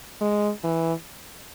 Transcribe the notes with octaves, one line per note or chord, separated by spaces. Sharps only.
G#3
E3